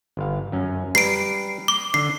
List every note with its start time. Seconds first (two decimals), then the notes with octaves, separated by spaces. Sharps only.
0.17 G1 F5
0.52 F#2 C#4
0.95 G3 B4 A#5 C7 D7
1.68 D6
1.94 D3 C7